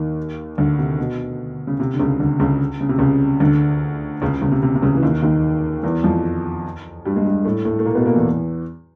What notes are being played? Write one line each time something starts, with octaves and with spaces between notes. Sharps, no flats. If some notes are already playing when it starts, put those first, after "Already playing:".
Already playing: D#2 D#3
D2 D3
C3
B2
C#3
C3
D3
C#2 C#3
D2 D3
C#2 C#3
C#3
C3
C#2 C#3
D2 D3
C#2 C#3
C#2 C#3
C3
C3
C3
C#2 C#3
E3
D#2 D#3
D#2 D#3
E2 E3
F2 F3
G2 G3
G#3
G2 G3
A2 A3
A2 A3
A3
A#2 A#3
B2 B3
A#2 A#3
E2 E3